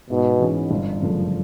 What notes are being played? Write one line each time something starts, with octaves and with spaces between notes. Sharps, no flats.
G#2 B2
E3 G#3 C#4
G1
F#2 C#3 F3 A3